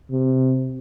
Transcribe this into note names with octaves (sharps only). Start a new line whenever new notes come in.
C3